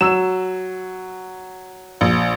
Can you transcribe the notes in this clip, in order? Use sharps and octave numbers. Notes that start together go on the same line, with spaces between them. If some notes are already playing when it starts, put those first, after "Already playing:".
F#3 E6 E7
A#1